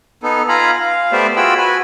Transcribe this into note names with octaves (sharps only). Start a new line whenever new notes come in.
B3 D#4 A4
F4 F5 G#5 A#5 B5
F5
A3 B3 G4 C5 D5 E5
F4 F#4 G#4 G5 B5 E6
F#4 B4 G#5 B5